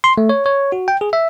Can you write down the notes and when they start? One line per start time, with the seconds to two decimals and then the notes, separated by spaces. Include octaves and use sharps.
0.04 C6
0.18 A3
0.29 C#5
0.46 C#5
0.72 F#4
0.88 G5
1.01 G#4
1.13 E5